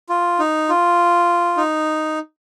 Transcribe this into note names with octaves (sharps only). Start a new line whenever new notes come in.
F4
D#4
F4
D#4